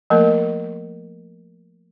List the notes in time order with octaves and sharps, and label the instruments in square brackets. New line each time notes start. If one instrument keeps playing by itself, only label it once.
[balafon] F3 A3 A#3 A#4